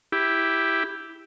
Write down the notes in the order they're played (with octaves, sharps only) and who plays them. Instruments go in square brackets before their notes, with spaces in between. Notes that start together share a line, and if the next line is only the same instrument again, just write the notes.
[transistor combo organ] E4 G4